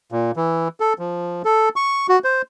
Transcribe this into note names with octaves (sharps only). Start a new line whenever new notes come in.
A#2
E3
A4
F3
A4
C#6
F#4
C5